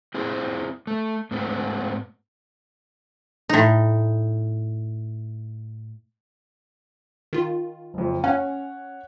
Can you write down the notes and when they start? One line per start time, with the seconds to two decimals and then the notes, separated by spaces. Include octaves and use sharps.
0.14 C4 E4 G#4 C5
0.87 A3
1.31 G#2 A3 B3 C4
3.49 A2 D#4
7.33 D#3 F4
7.94 F#1 F2
8.24 C#4 C#5 F#5